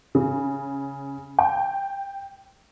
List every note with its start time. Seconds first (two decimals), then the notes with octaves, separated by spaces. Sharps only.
0.15 C#3
1.39 G5